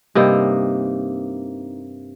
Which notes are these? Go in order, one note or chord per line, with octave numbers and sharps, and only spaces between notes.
G2 C3 A#3 D#4